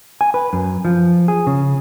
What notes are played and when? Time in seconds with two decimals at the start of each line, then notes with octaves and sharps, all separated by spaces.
0.21 G#5
0.34 B4
0.53 F#2
0.85 F3
1.28 G#4
1.47 C#3